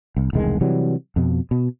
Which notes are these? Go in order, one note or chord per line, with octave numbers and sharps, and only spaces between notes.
C2
E1 C2 D#3 G#3
C3 E3 F#3 G3
F2 B2
B2